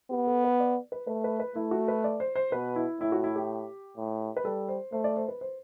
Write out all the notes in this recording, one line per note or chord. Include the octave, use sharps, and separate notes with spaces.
B3 G4
A4
B4
D5
B4
A3 B4
B4
B4
A3 E4
F#4
B4
D5
C5
C5
B2 B4
E4
A2 E4
F#4
E4
G4
A2
B4
G3 A4
C5
A3 C5
D5
C5
B4
C5